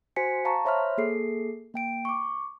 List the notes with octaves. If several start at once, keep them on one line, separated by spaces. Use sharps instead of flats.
F#4 C5 G#5 B6 C#7
F5 A5 A#5 C#6
C5 C#5 E5 B5 C6 F6
A#3 G#4 A4 C7
A#3 G5 D7
C#6 D6